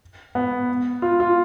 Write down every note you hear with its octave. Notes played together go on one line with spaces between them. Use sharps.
B3
F4
F4